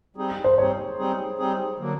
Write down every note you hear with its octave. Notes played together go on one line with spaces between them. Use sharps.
G3 C4 D#4 G#4
C5
G3 C4 D#4 G#4 C#5
G3 C4 D#4 G#4
G3 C4 D#4 G#4
D3 F#3 A#3